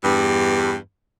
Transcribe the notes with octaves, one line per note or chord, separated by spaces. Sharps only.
E2 G2